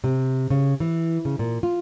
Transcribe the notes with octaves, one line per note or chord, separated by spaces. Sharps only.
C3
C#3
E3
C#3
A#2
F4